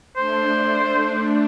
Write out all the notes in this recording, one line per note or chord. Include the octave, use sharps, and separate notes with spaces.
A3 D4 C5